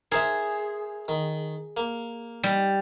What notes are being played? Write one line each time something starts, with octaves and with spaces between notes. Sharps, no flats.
G#4 A#4 C5 E5
D#3
A#3
G3